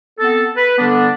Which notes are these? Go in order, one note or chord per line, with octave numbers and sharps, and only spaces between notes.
B3 C4 A4
B4
D3 G3 B3 D4